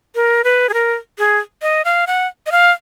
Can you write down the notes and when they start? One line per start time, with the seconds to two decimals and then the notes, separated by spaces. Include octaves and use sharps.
0.15 A#4
0.44 B4
0.69 G#4
0.74 A#4
1.18 G#4
1.62 D#5
1.85 F5
2.07 F#5
2.46 D#5
2.52 F5